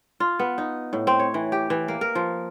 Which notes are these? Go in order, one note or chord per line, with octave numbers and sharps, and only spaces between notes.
F4
B3
D#4
A2
C4
C#5
E3
G4
E3
A#3
A#4
F3